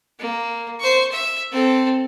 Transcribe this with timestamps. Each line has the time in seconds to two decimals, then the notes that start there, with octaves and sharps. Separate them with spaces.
0.19 A#3
0.80 C5 C#6
1.12 E5
1.51 C4 A4